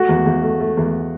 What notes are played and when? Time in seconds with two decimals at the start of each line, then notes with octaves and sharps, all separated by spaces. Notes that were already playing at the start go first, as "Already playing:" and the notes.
Already playing: A3 F#4
0.09 E2
0.26 E2
0.43 A3
0.60 A3
0.77 E2